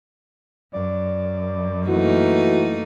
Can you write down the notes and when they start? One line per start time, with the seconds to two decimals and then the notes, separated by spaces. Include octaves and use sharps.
0.73 F#2 D5
1.87 E3 A3 A#3 D#4 F#4